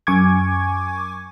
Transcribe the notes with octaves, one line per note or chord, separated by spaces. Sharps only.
F#2 G#5 C#6 D6 G#6